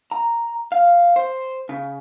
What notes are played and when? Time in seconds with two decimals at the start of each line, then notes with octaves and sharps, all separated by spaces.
0.11 A#5
0.72 F5
1.16 C5
1.69 C#3